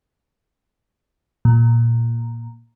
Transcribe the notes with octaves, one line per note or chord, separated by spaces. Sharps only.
A#2